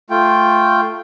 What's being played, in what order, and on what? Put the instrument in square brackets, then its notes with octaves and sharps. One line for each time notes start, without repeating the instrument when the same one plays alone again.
[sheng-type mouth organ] A3 F4 G5